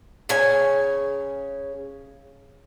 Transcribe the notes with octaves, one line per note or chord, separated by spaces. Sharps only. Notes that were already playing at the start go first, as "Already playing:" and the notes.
C#3 C#5 G#5